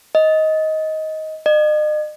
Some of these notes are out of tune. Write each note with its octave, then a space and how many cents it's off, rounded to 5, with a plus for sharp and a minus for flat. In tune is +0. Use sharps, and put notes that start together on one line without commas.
D#5 +15
D#5 -40